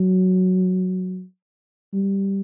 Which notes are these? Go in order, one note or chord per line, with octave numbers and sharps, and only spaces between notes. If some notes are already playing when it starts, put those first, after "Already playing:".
Already playing: F#3
G3